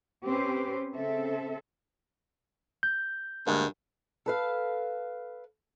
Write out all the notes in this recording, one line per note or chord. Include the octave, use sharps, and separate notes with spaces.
C4 C#4 G4 B4 C5
C#3 C4 A4 E5
G6
D2 G2 G#3 A#3
A4 B4 F5